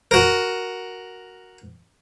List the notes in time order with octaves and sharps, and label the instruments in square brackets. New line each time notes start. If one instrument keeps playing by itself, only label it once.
[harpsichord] F#4 A#4